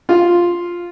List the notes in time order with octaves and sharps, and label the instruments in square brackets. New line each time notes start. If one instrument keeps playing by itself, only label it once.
[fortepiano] F4